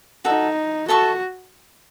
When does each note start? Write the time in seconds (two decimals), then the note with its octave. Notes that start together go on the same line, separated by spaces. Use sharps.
0.24 D#4 F#4 A4 E5
0.88 F#4 A4 E5 A5 C#6